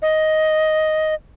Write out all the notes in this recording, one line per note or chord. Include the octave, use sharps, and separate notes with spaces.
D#5